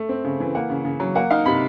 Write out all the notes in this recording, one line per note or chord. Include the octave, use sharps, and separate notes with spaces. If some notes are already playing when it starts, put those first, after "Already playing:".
Already playing: A3
C4
C#3
E3
A#3 F#5
C#3
C#3
F#3
A#3 F#5
D#4 F5
C3 B5